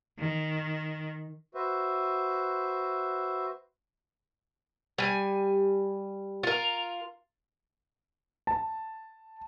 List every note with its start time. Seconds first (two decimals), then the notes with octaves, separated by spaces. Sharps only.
0.18 D#3
1.55 F#4 B4 C5 E5
4.98 G3 G#5
6.43 F4 A#4
8.47 A5